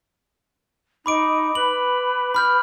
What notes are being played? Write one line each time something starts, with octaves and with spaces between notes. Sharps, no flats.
D#4 B5 D6 D7
B4 F#7
B5 F6 G6